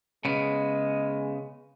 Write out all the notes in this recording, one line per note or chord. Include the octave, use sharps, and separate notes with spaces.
C#3 G#3 B3